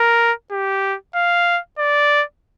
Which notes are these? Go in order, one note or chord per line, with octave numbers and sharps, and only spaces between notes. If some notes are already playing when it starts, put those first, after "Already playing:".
Already playing: A#4
G4
F5
D5